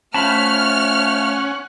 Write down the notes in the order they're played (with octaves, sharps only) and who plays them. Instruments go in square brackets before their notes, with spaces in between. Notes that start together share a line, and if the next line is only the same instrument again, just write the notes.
[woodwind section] F3 A3 [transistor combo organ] C#4 F#5 [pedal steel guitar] A5 B5 [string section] F6